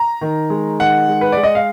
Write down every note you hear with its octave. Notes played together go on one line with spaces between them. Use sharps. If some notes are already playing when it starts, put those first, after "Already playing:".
Already playing: A#5
D#3
G#3
D#3 F#5
G#3
B4
G#3 D5
D#5
F5